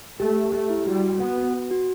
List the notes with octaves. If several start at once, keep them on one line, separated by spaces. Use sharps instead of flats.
A3 G4
G4
A3 G4
E4
G3 F#4
F#4
B3 F#5
F#4
F#4
F#4